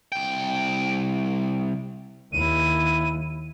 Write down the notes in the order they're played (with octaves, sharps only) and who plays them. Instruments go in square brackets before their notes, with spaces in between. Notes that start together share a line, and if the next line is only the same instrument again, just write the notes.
[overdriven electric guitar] C2 G5
[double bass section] D#2 [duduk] E4 [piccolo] D#7